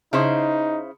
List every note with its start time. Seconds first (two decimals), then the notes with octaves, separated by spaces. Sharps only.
0.13 C#3 D#4 E4 C5